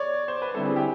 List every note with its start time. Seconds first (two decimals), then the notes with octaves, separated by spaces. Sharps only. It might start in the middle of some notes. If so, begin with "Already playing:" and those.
Already playing: C#5 D5
0.28 C5
0.42 B4
0.54 D3 G3 C4 E4 A4
0.66 G#4
0.76 G4